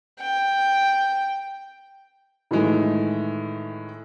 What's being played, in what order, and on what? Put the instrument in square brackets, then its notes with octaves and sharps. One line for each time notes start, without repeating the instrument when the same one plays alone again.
[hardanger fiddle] G5
[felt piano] A2 D#3 E3 G#3 A3